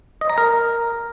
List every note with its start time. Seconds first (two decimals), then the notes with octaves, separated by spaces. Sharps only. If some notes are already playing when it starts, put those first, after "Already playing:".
0.21 D#5
0.29 A#5
0.38 A#4